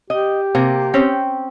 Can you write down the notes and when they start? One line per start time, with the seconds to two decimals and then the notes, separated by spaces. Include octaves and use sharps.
0.10 G4 D#5
0.55 C3 A#3
0.94 C4 C#4 G5